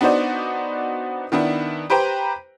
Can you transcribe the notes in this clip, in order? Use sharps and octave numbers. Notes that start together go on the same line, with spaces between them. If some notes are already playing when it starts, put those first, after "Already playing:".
B3 D4 D#4 F#4 C5 D5
D#3 B3 D4 E4
G4 B4 C5 G5 A#5